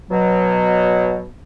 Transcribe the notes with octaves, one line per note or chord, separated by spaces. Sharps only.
B2 F#3